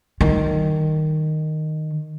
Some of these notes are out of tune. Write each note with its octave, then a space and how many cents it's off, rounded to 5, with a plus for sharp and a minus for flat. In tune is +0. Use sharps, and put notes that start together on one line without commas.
D#3 -5 G3 -45